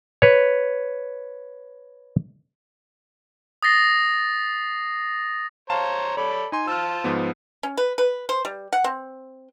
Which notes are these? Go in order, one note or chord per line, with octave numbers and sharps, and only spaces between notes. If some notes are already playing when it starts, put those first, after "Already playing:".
B4 C#5
D#6 A6 A#6 C7
C5 C#5 F5 A5 A#5 E7
A4 C#5 D5 B5
D#4 G#5 C6
F4 C5 A5 E6 F6
G#2 F3 B3
C#4
B4
B4
C5
G3
F#5
C4